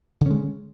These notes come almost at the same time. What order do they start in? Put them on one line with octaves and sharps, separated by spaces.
D3 C#4 G#3